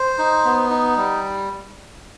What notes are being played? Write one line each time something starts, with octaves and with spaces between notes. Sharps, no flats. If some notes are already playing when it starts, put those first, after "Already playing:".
Already playing: C5
D#4
B3
D#4
G3